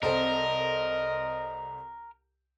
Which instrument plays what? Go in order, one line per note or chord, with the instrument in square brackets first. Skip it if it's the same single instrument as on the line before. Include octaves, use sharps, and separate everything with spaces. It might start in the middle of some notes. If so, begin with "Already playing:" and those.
[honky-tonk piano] C2 C4 A4 [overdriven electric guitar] A#4 [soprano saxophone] D#5